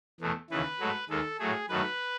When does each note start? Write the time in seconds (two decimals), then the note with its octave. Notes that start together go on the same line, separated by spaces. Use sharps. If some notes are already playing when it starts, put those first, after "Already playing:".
0.20 E2 B2 A3
0.50 D#2 C#3 E3 B4
0.80 G#2 F#3 A3
1.09 D#2 D#3 G#3 A4
1.39 A2 F#3 A3 G#4
1.69 F#2 D#3 F#3 A3 B4